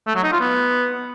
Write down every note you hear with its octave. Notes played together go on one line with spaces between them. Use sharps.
A3
F#3
D#4
F4
B3